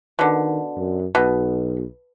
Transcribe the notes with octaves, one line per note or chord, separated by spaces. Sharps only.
B2 D3 D#3
F#2
B1 B2